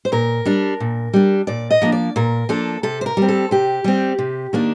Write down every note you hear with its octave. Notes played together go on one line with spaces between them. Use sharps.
C5
A#2 A#4
G3 D4
A#2
G3 D4
A#2 D5
D#5
F3 A#3 D4
D5
A#2 A#4
F3 A#3 D4 A4
C3 A4
C5
A#4
G3 C4
A4
C3 G4
G3 C4
C3
D#3 A#3 D4